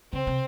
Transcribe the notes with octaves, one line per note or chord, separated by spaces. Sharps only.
C#3 C4
C3